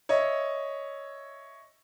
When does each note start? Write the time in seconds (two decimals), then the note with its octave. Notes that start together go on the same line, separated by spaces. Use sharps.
0.09 C#5 D#5 E5